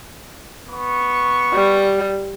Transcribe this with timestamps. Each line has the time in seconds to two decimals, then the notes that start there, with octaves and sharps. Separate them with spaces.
0.69 B3 C#6
1.53 G3